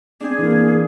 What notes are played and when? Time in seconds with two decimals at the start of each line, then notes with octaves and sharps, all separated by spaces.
0.21 C4 D4 G#4
0.39 E3 A#3